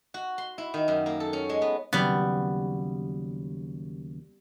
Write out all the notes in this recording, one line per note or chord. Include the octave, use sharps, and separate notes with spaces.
F#4
C6
E4
D#3
F#2
A#3
A4
C#4
G#3
B3
D#2 C#3 F#3 G3 B3